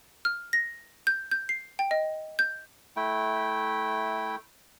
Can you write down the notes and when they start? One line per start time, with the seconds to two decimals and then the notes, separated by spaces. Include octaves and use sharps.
0.25 F6
0.53 A#6
1.07 G6
1.31 G6
1.49 C7
1.79 G5
1.91 D#5
2.39 G6
2.96 A3 E4 G5